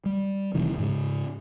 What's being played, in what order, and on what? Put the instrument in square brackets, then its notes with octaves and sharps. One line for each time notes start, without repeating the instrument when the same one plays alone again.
[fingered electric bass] G3
E1 C3 D#3 E3
G#2 C#3